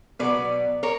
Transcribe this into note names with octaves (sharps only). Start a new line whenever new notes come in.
B2 F#3 B3 B4 D5
A#4 C#5